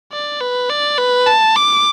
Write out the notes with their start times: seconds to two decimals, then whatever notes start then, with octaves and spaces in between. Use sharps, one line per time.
0.12 D5
0.41 B4
0.70 D5
0.98 B4
1.27 A5
1.56 D6